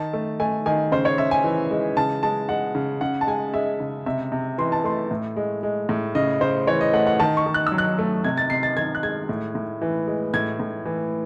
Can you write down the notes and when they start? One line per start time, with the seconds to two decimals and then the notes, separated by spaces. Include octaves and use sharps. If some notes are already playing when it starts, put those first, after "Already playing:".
Already playing: D#3 A5
0.13 A3
0.40 A3 G#5
0.66 D#3 G#5
0.92 C#3 C5
1.05 C#5
1.18 C#3 E5
1.31 G#5
1.44 E3
1.71 G#3
1.97 C#3 A5
2.23 G#3 A5
2.49 G#3 F#5
2.75 C#3
3.01 C#3 F#5
3.21 A5
3.27 G#3 G#5
3.54 G#3 E5
3.80 C#3
4.06 C3 E5
4.32 C3
4.58 E3 C6
4.72 A5
4.84 A3 C6
5.11 A2
5.36 G#3
5.63 G#3
5.89 A2
6.15 C#3 D#5
6.41 C#3 C5
6.67 E3 C#5
6.81 D#5
6.93 A3 F#5
7.07 F#5
7.20 D#3 A5
7.37 C#6
7.46 D#3
7.54 F#6
7.67 E6
7.72 F#3
7.78 F#6
7.99 A3
8.24 C3 G#6
8.38 A6
8.50 C3 C7
8.63 A6
8.77 D#3 G#6
8.95 F#6
9.03 G#3 G#6
9.29 A2
9.55 A2
9.81 E3
10.07 G#3
10.34 A2 G#6
10.60 A2
10.85 E3